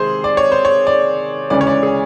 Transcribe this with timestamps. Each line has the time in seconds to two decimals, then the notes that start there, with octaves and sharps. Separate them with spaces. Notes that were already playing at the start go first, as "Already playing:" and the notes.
Already playing: C3 D#3 G#3 G#4 C5
0.24 D5
0.37 C#5
0.52 C5
0.65 C#5
0.87 D5
1.50 D2 C#3 E3 G#3 C#4 D5
1.61 C#5
1.67 D5
1.83 G#4